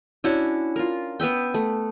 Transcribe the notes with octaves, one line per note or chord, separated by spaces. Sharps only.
C#4 D4 E4 F#4
F4 A#4
B3 B4 E5 G5
A3